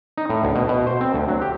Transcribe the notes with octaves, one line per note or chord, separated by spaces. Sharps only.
D#4
A2
D2
B2
B2
C5
C4
D2
F#3
G4